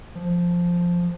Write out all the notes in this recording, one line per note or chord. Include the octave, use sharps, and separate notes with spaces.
F3